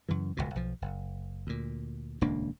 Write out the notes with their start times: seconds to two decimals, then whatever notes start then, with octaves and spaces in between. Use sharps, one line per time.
0.09 F#2 C#3 E3
0.37 D#1 G#1 C#2 B2
0.55 B1 F3
0.82 F#1
1.47 D2 A#2
2.21 D#1 C#2 A#3 D4